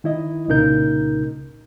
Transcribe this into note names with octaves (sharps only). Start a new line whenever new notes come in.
D#3 E4 D#5
C2 A#2 C#3 D#4 A#4 G6